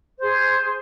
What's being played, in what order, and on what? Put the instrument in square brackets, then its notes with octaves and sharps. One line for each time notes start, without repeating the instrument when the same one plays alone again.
[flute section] G#4 C5